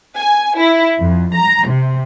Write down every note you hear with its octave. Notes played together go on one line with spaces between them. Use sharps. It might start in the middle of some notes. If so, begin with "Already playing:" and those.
G#5
E4
F2
A#5
C3